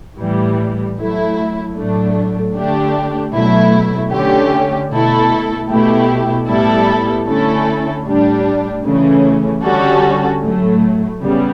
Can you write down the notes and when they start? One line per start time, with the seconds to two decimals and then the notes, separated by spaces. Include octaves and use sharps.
0.18 A2 E3 G3
0.96 F#3 A3 E4
1.75 A2 F#3 A3 D4
2.54 D3 A3 D4 G4
3.32 B2 F#3 A3 E4
4.11 D3 A3 C#4 G4
4.90 B2 A3 E4 A4
5.69 B2 A3 E4 G4
6.47 A2 G3 B3 E4 A4
7.27 D3 A3 C#4 E4 A4
8.06 A2 G3 D4
8.84 C#3 E3 A3 C#4
9.63 D3 G3 C#4 F#4 A4
10.42 A2 F#3 A3
11.21 C#3 G3 B3